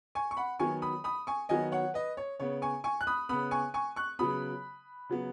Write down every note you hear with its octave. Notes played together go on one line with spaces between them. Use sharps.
G#5 C#6
C#6
F#5 B5
D#3 F#3 B3 G#5 C#6
B5 D#6
B5 D#6
G#5 C#6
D#3 F#3 B3 D#5 G#5
C#5 F#5
B4 D#5
C#5
C#3 B3 C#5
G#5 C#6
G#5 C#6
F#6
B5 D#6
C#3 B3 B5 D#6
G#5 C#6
G#5 C#6
C#6 F#6
C#3 F#3 B3 B5 D#6
C#3 F#3 B3